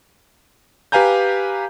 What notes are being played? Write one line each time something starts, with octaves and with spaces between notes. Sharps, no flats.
G4 B4 F5 G#5 A#5 G6